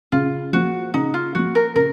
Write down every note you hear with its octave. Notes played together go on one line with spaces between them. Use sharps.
C#3 F4
F3 A#3 F#4
C#3 D#4
F4
F3 A#3 F#4
A#4
C#3 A#4